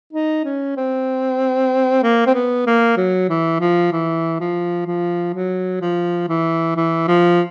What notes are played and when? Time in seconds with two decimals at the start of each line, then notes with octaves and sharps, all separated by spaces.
0.13 D#4
0.45 C#4
0.77 C4
2.03 A#3
2.27 C4
2.34 B3
2.67 A#3
2.97 F#3
3.29 E3
3.60 F3
3.92 E3
4.40 F3
4.87 F3
5.34 F#3
5.81 F3
6.29 E3
6.76 E3
7.08 F3